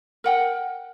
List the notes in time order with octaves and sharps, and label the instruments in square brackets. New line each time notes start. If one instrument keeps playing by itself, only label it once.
[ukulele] A#4 F#5 G5